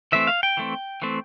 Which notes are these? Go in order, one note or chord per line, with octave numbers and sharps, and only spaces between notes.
E3 A3 C4 E5
F5
G5
E3 A3 C4
E3 A3 C4